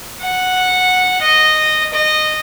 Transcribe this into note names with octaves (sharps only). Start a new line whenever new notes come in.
F#5
D#5
D#5